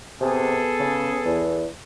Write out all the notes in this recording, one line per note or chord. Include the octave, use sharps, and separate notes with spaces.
C3 B3 G#4 A4
C#3
E2